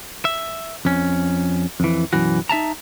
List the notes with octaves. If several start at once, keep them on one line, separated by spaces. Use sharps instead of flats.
E5
F2 C#4
F2 E3
B1 F#2 E3 F#4
D#4 E5 A5 A#5